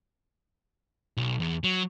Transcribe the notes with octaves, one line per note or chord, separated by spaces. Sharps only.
B1
E2
F#3